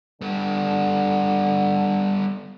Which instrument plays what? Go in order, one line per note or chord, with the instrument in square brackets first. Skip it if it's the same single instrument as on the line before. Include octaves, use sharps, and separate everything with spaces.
[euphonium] D3 [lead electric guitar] G3 B3